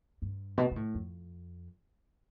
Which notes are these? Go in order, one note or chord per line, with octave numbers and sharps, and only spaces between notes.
G2
B2
B2
A2
F2